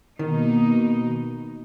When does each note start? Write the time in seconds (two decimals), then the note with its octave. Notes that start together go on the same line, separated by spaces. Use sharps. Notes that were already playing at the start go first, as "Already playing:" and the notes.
0.19 B2 D#3 A#3 D#4